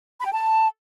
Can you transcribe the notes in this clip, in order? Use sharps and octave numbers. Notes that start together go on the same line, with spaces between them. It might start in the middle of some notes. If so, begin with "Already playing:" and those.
B5
G5
A5